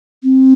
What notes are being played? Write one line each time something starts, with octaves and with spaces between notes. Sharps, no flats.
C4